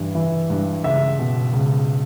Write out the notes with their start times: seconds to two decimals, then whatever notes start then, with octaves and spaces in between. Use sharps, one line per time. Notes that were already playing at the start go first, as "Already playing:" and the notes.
Already playing: G2 E3
0.15 E3
0.50 G2
0.84 C#2 E5
1.19 B2
1.53 C#2